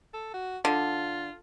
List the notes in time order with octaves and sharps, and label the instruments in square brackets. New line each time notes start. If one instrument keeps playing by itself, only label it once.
[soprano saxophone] A4
F#4
[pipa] D3 [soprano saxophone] F4